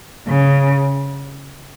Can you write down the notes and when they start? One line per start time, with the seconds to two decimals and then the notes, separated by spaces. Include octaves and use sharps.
0.27 C#3